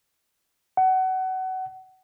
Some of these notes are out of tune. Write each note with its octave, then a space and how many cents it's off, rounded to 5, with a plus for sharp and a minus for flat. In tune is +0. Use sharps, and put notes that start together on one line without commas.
F#5 +25